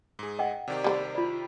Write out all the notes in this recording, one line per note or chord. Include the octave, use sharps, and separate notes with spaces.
G#2 G#4
D#5 F#5 G5
C3 D#3 G4 D5
G3 A4 C5
F4 D5 B5